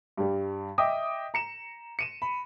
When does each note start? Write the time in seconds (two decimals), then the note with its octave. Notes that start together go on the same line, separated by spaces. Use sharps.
0.17 G2 G3
0.78 D#5 E5 G5 D6 D#6
1.34 A#5 C#7 E7
1.99 C#7 D#7 E7
2.22 B5